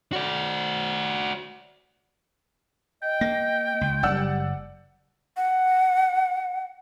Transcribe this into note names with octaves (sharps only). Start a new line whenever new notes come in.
F#4 D5
D#5 G5
A#3 A#6
C#2
F#1 G3 D5 F#5 E6
F#5